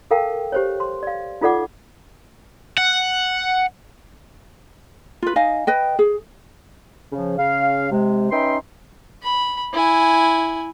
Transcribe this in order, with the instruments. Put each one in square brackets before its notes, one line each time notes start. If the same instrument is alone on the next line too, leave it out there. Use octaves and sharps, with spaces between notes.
[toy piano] A4 A#4 F5 G5 A5
G4 C5 C#5
C6
D5 F5
D#4 F4 A4 D5 F#5 D6
[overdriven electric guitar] F#5
[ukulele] F4 B4
D#4 D#5 F5 G#5
B4 D#5 G5
G#4
[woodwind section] C#3 F3
C#3 F5
C3 G#3
C#4 D#4 B4 E5 G5 C6
[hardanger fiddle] B5
E4 G#5